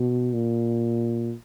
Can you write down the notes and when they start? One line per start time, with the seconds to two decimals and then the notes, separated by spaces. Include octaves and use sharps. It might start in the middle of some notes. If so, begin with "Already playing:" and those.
Already playing: B2
0.33 A#2